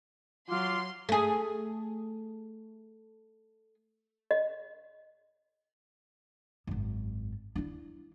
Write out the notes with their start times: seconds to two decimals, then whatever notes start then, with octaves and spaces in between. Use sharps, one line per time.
0.49 F#3 F4 C6 D6
1.09 A3 G#4
4.31 D#5
6.67 G#1 F#2
7.55 D4 E4